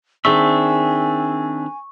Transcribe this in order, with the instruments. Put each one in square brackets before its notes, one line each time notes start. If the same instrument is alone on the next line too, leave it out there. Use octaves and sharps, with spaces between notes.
[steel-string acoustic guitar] D#3 G#4 [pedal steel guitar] C4 D4 E5 [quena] G#5 [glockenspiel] C#6